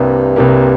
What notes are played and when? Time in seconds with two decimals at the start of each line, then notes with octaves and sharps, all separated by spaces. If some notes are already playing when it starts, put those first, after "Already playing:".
Already playing: C2 G2 C3 A#3
0.36 C2 C3 A#3